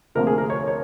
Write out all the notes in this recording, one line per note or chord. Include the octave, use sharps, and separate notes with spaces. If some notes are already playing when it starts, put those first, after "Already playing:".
D2 C3 F3 A#3 A#4
G#4
A#4
C#5
C#5